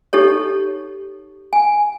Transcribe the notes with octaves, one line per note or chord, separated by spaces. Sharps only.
D#4 G4 A4 C#5
G#5